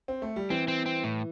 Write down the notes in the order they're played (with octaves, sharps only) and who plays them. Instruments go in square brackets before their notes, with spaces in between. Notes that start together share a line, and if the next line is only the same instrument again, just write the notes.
[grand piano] C4
A3
G3
[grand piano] E3 [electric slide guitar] C4
[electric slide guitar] C4
C4
A2